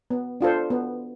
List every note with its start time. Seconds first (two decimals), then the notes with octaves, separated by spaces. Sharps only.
0.10 B3
0.41 D4 F4 A4 C5
0.70 B3